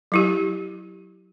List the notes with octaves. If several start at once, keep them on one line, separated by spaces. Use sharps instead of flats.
F#3 E4 G4